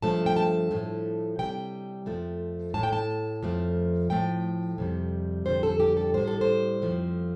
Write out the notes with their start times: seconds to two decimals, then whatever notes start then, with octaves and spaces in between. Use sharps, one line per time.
0.02 G2 F3 A3 A5
0.26 G5
0.36 A5
0.71 A2 F3 A3
1.39 C3 G3 G5
2.06 F2 F3 A3
2.74 A2 A3 A5
2.83 G5
2.93 A5
3.43 F2 F3 A3
4.10 A2 F3 A3 G5
4.78 F2 C3 G3
5.46 F2 D3 G3 C5
5.63 A4
5.80 G4
5.97 A4
6.14 A2 G3 C5
6.27 A4
6.41 C5
6.82 F2 F3 A3